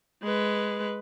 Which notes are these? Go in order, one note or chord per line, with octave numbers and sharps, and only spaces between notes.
G#3 B4